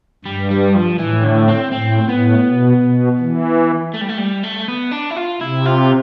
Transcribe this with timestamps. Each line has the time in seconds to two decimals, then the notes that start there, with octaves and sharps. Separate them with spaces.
0.25 G2 G3
0.51 G3
0.75 F3
0.99 A2 E3
1.24 D3
1.48 C4
1.72 A2 C4
2.09 A2 B3
2.47 B2
2.83 B2
3.20 E3
3.94 A3
4.01 G3
4.09 A3
4.18 G3
4.43 A3
4.68 B3
4.92 D4
5.11 E4
5.16 F4
5.41 C3 E4
5.66 F4